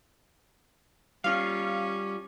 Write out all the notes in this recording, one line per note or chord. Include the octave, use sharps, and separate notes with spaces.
G3 C#4 F4 F5